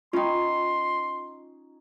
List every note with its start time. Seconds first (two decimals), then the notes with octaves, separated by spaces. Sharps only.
0.13 C#4 D#4 F4 G5 C6